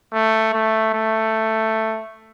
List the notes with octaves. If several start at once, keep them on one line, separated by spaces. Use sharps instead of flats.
A3
A3
A3